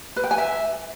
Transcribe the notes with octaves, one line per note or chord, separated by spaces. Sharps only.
B4
G5
G#5
E5